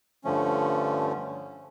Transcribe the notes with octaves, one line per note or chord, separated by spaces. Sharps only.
G2 D3 F3 A3 C#4